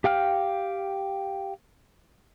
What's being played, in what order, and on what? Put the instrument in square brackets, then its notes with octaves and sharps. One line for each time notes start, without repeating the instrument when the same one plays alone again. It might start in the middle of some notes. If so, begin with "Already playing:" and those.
[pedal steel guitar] G4 F5 G5 F6